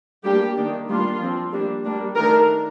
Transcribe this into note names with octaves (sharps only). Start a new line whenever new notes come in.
G3 A#3 D4 G4
D#3 A#3 D4
G3 A#3 D4 F4
F3 C4
G3 A#3 D4
G3 A#3 D4
D#3 A3 D4 A#4